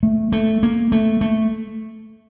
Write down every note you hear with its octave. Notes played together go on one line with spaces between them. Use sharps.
A3
A3
A#3
A3
A3